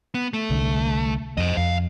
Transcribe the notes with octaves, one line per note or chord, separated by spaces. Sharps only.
B3
A3
C2 D3
F2 C5 D#5
F2 F5